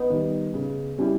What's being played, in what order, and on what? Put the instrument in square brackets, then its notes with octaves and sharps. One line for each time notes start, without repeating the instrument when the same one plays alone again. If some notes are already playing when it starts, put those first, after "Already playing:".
Already playing: [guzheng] B3 D#4
[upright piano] D#3 G3
C#3
G3 C#4 E4 G4